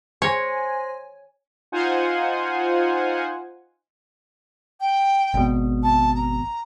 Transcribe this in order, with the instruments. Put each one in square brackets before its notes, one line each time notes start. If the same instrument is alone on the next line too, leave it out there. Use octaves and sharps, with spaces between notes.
[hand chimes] C5 C6 A#6 [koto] C#5 [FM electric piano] G#5
[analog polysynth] D#4 F4 C5 F#5 G#5
[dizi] G5
[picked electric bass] G#1 B2
[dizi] A5
A#5